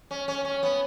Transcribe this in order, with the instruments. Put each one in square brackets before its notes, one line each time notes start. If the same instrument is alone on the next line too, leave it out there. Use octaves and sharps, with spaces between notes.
[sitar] C#4
C#4
C#4
B3